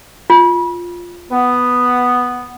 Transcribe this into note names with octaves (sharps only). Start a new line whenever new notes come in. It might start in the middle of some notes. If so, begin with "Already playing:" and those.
F4
B3